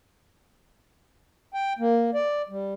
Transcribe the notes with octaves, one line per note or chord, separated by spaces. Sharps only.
G5
A#3
D5
G3